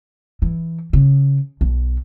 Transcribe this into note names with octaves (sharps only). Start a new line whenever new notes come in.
E3
C#3
B1